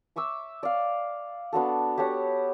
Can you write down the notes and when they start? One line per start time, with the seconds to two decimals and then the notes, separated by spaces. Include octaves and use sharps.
0.16 E5 C#6 D6 E6
0.63 D5 F5
1.53 B3 D4 F#4 A4
1.98 G4 A4 C#5 F#5